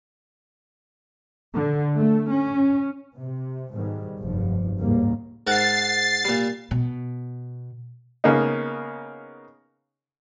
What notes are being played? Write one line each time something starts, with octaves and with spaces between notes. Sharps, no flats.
D3
A3
C#4
C3
G#2 B2 D#3 G3 G#3
F1 B1 G2 F3
A1 D#2 G#2 C#3 G3 A#3
G#2 A#4 F#5 A6 C7
A#2 G3
B2
C#3 A#3 B3 D#4